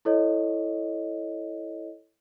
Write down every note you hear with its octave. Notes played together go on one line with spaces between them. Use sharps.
E4 A4 C#5 D#5